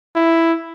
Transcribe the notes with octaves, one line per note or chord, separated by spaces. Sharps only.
E4